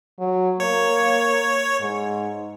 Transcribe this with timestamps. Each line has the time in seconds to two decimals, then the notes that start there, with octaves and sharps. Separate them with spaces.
0.19 F#3
0.60 A#3 C#5
1.80 G#2